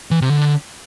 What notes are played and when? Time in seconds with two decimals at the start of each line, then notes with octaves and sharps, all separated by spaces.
0.11 E3
0.21 C3
0.30 D3